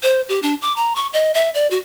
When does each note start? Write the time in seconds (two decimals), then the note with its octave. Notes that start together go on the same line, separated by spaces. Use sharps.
0.03 C5
0.29 G4
0.42 D4
0.62 D6
0.76 A#5
0.96 C#6
1.13 D#5
1.34 E5
1.54 D5
1.71 F#4